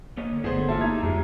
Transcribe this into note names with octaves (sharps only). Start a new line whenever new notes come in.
A#3 C#5 D#5
D3
G1 A3 B3 E4 G#4 C5
E2 A#3 E4 F4 G4 A4 A5
D#4 E5 A#5 G#6
F2 F#3 G#3 F4